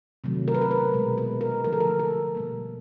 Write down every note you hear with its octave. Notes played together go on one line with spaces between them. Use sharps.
C3 D#3 F#3 A3
A#4
B4
A#4
B4
B2 G#3
B4
A#4
D3 F3 A3 A#4
A4
A#4
A4
B2 G3 A#3